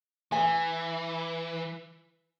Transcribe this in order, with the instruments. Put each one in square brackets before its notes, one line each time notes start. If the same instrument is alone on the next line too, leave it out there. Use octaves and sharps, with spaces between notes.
[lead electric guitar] E3 [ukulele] G#5